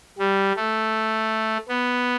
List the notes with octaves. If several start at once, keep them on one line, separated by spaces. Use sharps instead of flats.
G3
A3
B3